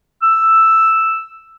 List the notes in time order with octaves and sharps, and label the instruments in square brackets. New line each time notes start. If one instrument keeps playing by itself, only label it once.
[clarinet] E6